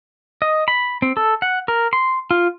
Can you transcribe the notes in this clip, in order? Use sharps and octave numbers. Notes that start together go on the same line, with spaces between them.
D#5
B5
C4
A4
F#5
A#4
C6
F4